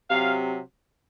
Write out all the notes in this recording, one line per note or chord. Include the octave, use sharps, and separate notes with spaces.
C3 F#3 F5